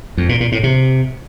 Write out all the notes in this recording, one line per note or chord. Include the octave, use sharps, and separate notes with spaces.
F2
A#2
A#2
A2
C3